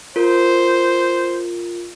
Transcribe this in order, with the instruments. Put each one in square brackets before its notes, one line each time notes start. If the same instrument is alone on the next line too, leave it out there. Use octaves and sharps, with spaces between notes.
[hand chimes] F4 A#4 [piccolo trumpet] C5